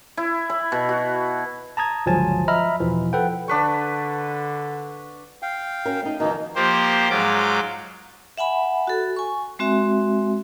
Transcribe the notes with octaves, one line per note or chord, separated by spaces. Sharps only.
E4
B5
B2
F#4
A5 A#5 D#6 G#6
G1 C#2 F3 F#3 G#5 A5
D#5 E5 A#5 B5 F6
E2 B2 E3 F3
A4 B4 F#5 G5
D3 D4 B4 C#6
F5 G5
C#4 F#4 A#4
A3 D#4
F2 B2 D#3 E3 D#4
F3 A#3 G4 C5
G#2 F#3 F4 D6
E5 F#5 G#5 B5
F#4 A4
G#5 C#6
G#3 C4 F#4 E5